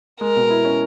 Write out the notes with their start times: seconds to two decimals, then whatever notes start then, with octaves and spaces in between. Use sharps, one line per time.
0.20 G#3 A#4
0.36 B2
0.50 E4
0.65 C#4